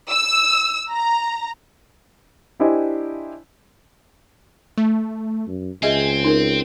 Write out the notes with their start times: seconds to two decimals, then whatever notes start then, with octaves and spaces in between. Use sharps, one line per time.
0.10 E6
0.89 A#5
2.60 D4 E4 G4 C5 D#5 G#5
4.78 A3
5.48 F#2
5.83 C#2 C4 G#4 D#5 E5 G#5
6.24 D#4 A#4